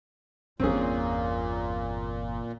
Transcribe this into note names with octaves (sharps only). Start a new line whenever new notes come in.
G1 E2 A#2 C4 C#4 G#4